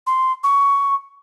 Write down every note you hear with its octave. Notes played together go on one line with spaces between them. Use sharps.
C6
C#6